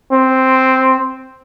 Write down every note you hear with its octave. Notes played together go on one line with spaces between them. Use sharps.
C4